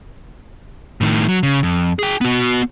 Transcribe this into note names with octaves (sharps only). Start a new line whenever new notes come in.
A2 D#3
F#3
C#3
F2
G#4 G5
B3 F#4